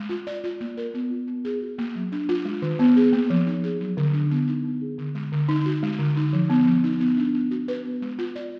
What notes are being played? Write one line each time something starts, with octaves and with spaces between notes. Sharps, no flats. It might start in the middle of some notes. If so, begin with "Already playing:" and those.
Already playing: G#3
F4
D5
F4
A#3
A#4
B3
F4
B3
G#4
F#4
A#3
F#3
D4
F4
G#3
D#3
B3
G#4
A#3
F3
D#4
G#4
F#3
D3
D4
B3
D#4
B3
G#4
D3
G#3
D3
D#4
F#4
G#3
D3
D#4
F3
B3
F3
D#4
B3
D4
B3
F#4
B4
B3
G#3
F4
D5